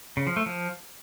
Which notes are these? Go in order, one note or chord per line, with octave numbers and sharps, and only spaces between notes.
C#3
F3
A3
F3